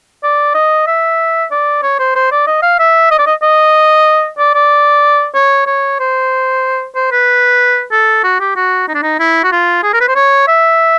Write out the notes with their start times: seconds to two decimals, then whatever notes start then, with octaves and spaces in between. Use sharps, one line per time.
0.24 D5
0.55 D#5
0.87 E5
1.51 D5
1.83 C#5
1.99 C5
2.16 C5
2.32 D5
2.47 D#5
2.63 F5
2.80 E5
3.11 D#5
3.19 D5
3.27 D#5
3.43 D#5
4.39 D5
4.55 D5
5.35 C#5
5.67 C#5
6.00 C5
6.96 C5
7.12 B4
7.92 A4
8.24 F#4
8.40 G4
8.56 F#4
8.88 D#4
8.95 D4
9.03 D#4
9.19 E4
9.44 F#4
9.52 F4
9.83 G#4
9.94 A#4
10.01 B4
10.08 C5
10.16 C#5
10.48 E5